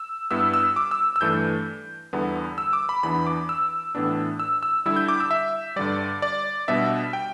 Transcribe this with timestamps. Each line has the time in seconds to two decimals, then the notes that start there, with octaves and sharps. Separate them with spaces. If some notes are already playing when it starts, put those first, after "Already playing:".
Already playing: E6
0.31 G2 G3 B3 E4 E6
0.54 E6
0.76 D6
0.91 E6
1.16 E6
1.21 G2 E3 A3 D4 G6
2.13 E2 D3 G3 B3 E4
2.58 E6
2.73 D6
2.89 B5
3.03 E2 E3 B3 D4 B5
3.27 D6
3.49 E6
3.95 A2 E3 B3 D4
4.40 E6
4.63 E6
4.86 D3 G3 E4 E6
4.96 G6
5.08 D6
5.20 E6
5.31 E5
5.76 G2 D3 G3 D5
6.22 D5
6.68 B2 G3 B3 D4 E5
7.13 G5